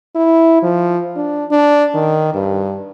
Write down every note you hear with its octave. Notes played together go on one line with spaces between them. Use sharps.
E4
F3
D4
D4
D#3
G2